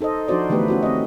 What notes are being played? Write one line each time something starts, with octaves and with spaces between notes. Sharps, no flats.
D#4 A4 C5 D#5
F3 D4 D#4 F#4 C5 D5
D3 E3 A3 B3 G4 B4
C#4 E4 F#4
C4 D#5